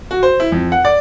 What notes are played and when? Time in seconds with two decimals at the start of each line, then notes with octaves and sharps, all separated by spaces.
0.11 F#4
0.23 C5
0.40 E4
0.52 F2
0.72 F#5
0.85 D5